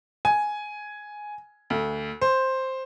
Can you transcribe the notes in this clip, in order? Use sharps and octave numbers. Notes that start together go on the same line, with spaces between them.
G#5
D2
C5